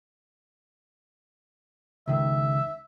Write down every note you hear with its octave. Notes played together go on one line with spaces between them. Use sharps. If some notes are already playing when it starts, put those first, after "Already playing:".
C#2 D#3 E5